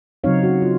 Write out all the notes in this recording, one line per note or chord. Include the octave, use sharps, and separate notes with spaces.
C#3 F#3 C4 D#4 C#5 F5
F#4
F4